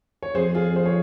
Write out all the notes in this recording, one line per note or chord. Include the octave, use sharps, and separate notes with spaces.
C#5
F2 G#4 C5
F4 G#4
G#4 C5
C#5